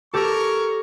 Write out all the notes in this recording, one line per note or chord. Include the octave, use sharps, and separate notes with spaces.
G4 A4 A#4 C#5 C#6